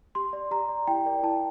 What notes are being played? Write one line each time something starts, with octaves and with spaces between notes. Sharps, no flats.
G4 C6
D5
G4 A#5
D5
E4 G5
A#4 D5
E4 A5